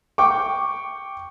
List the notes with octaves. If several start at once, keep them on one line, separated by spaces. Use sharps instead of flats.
G5 C#6 D6